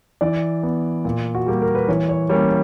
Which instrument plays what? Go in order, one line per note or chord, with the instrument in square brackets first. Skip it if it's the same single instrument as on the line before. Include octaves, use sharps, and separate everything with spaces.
[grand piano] E3 D5
B3
A#2
F#4
G3 A#3 G4
A#4
B4
E3 C#5
C#5
G3 A#3 C#4 C#5